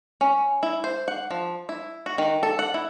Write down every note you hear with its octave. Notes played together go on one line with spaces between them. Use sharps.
C#4
E4
C5
F#5
F3
E4
F#4
D#3
A4
F#5
E4